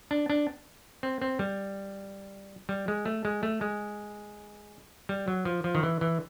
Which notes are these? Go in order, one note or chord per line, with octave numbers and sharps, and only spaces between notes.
D4
D4
C4
C4
G3
G3
G#3
A3
G#3
A3
G#3
G3
F#3
F3
F3
D#3
E3
E3